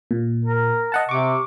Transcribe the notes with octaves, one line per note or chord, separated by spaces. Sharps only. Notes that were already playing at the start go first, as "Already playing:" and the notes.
A#2
A#4
D#5 F#5 A5
C3 C#6 D6